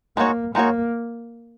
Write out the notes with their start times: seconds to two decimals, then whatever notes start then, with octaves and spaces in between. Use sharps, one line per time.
0.17 G#3 A#3 D#4 F#4 C#5
0.55 G#3 A#3 D#4 F#4 C#5